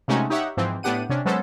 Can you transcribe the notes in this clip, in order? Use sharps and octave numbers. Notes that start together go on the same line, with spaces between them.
C3 G#3 A3 C#4 D#4 F#4
D#4 G4 C#5 E5 F#5
G#2 E3 F3 C4
A2 B3 D4 G4 F#5 D#7
C3 C#4 D4
F#3 G#3 B3 C#4 A4 C5